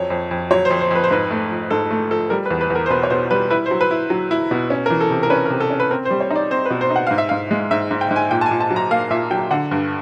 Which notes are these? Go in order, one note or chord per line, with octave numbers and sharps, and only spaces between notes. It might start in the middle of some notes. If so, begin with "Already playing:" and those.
Already playing: F2 F#3 C#5
F2
F2
F#3 C#5
C5
F2
C5
F2 B4
C5
G#2 B4
A3
F3
G#2 A4
A3
F3 A4
G3 A#4
B4
E2
B4
E2 A#4
C5
B2 B4
C#5
B2 C5
G3 B4
E4 B4
C5
F#3
B4
E4
F#3
E4
B2
C#4
A#4
E3
A4
C3
A#4
C#4 B4
A#4
C3
A4
C#4
B4
C4 A#4
C5
G3
C#5
D#4 D5
C4 C5
B4
B2
C5
D#4
F#5
G#2 F5
E5
G#2 F5
G#3
G#2 E5
G#2
G5
G#2
G#5
A#2 G5
A5
G#5
A#2
A5
F#3
A#5
A#3 F5
A#2 E5
F#3 G5
D3 F#5
G2